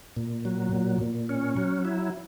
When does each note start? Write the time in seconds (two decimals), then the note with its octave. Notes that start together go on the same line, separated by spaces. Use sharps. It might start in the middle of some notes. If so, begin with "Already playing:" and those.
0.16 A#2
0.45 F#3
0.73 A#2
1.01 A#2
1.29 C#4
1.57 F#3
1.85 E4